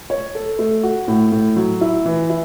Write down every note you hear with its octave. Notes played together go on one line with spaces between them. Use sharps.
C#5
A4
A3
F#4
A2
A2
F#3
E4
E3
E4